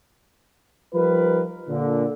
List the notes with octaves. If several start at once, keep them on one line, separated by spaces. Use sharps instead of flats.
F3 G3 D#4 F4 A#4 B4
A#2 D3